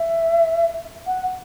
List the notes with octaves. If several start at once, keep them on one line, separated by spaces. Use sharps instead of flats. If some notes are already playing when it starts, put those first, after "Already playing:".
Already playing: E5
F#5